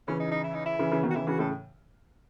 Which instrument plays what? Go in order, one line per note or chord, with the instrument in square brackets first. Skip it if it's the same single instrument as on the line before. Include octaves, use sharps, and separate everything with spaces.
[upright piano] C#3 E3 [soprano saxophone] C#4
[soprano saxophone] D#4
D#4
E4
D#4
E4
[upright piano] C#3 E3
C#3 E3
B2 D#3
[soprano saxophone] F#4
[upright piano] C#3 E3 [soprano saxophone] E4
[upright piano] C#3 E3 [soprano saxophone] F#4
[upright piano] A2 C#3 [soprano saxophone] A4